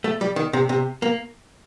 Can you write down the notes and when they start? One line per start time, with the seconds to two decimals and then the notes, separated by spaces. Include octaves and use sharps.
0.04 A3
0.21 G3
0.36 D#3
0.53 C3
0.69 C3
1.02 A#3